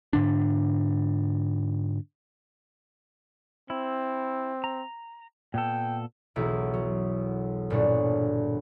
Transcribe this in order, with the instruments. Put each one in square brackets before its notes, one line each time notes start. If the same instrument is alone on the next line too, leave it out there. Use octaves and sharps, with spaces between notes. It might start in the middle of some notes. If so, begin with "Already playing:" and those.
[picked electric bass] G#2 D3 D4
[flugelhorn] C4 [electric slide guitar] E4
[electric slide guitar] A#5
[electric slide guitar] A#2 B3 A4 [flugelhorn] G5
[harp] E1 B1 E4
F#3
G1 A#2 D4 C#5